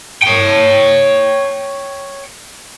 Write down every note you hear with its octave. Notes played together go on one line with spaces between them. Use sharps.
C#5 G5